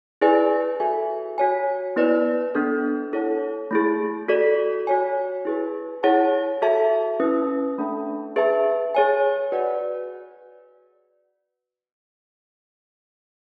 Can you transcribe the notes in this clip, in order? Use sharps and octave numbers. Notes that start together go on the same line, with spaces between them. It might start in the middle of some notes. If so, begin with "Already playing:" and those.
E4 G#4 B4 D5 G#5
F#4 A4 E5 G#5
F#4 C#5 G#5
B3 E4 B4 D5
B3 D4 A4
E4 A4 C#5 F#5 A5
A3 E4 G#4
F#4 A4 D5
F#4 C#5 G#5
E4 G#4 B4
E4 G#4 C#5 F#5 A5
F#4 A4 E5 A5
C#4 E4 B4
A3 D4 A4 E5 A5
G#4 B4 E5 A5
G#4 C#5 G#5
F#4 B4 D5 F#5